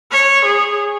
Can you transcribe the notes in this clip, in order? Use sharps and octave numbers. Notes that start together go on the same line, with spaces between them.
C#5
G#4